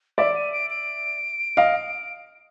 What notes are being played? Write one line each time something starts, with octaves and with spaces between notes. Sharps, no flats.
D5 E5 D7
D#7
D7
D7
D#5 F5